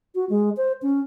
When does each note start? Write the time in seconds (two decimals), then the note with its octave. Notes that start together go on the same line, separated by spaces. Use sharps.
0.15 F#4
0.30 G#3
0.57 C5
0.82 C#4